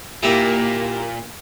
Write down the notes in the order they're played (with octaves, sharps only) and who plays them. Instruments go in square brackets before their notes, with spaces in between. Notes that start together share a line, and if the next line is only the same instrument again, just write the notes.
[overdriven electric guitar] A#2 [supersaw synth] A#3 [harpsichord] E4 G4 E5